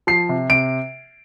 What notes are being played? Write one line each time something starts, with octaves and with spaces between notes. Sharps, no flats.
F3 C7
C3
C3 D7